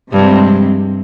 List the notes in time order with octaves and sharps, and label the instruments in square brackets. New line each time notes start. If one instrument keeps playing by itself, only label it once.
[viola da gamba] G2 [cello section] C3 F3 G#3 C4